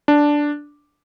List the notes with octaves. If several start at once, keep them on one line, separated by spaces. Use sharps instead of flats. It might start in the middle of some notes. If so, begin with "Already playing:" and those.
D4